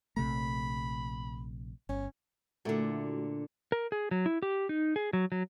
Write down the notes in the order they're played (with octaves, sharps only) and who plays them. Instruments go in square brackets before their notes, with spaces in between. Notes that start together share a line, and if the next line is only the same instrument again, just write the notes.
[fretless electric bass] A#1 C3 A3 [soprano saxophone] B5
[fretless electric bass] G1 [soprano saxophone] C#4
[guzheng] A#2 D3 [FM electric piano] A3 E4 F#4
[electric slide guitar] A#4
G#4
F#3
E4
G4
D#4
G#4
F#3
F#3